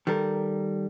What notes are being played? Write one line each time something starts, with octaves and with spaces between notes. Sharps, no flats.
D#3 G3 A4 A#4